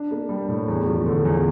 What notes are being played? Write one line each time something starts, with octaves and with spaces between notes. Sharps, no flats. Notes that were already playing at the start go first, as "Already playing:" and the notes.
Already playing: D4
A#3
G3
A2
E2
F3
D3
E2